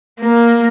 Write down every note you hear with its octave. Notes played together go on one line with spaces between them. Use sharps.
A#3